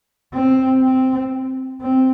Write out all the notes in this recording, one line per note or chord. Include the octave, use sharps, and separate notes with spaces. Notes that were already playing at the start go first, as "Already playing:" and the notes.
C4
C4
C4